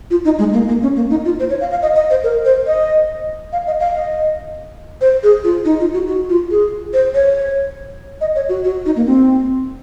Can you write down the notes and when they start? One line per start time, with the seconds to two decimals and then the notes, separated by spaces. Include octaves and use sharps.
0.11 F4
0.25 D#4
0.39 G#3
0.53 A#3
0.68 A#3
0.82 C#4
0.96 A#3
1.10 D#4
1.25 F4
1.39 C5
1.50 C#5
1.61 F5
1.71 F5
1.82 D#5
1.96 D#5
2.11 C5
2.24 A#4
2.45 C5
2.67 D#5
3.53 F5
3.67 D#5
3.80 F5
3.95 D#5
5.01 C5
5.23 G#4
5.44 F4
5.65 D#4
5.80 F4
5.93 F#4
6.08 F#4
6.30 F4
6.51 G#4
6.93 C5
7.14 C#5
8.21 D#5
8.35 C#5
8.49 F#4
8.64 F#4
8.86 D#4
8.96 A#3
9.06 C4